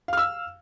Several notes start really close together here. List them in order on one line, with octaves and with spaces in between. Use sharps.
F5 F6 E6